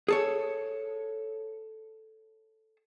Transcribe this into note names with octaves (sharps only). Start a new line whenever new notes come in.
G#4 A4 C#5